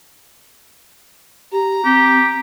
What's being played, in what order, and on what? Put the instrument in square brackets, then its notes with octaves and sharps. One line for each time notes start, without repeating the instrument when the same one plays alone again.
[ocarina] G4 [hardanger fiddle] A#5
[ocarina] C4 [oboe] G4